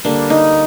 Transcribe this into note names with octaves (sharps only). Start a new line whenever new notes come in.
D3 G3 A#3 D4
D#4